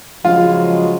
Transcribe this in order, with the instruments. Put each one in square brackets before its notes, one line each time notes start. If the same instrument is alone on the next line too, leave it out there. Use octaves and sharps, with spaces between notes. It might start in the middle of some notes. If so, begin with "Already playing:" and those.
[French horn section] C#3 F#3 G#3 [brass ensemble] F3 [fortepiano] F4